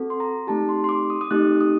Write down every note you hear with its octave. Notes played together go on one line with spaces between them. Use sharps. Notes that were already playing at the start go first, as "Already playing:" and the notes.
Already playing: C4 F#4 A4
C6
A#5
A3 C4 D#4 G4 A5
C6
C6
D6
D#6
D#6
A3 C4 D#4 G4 F#6
D#6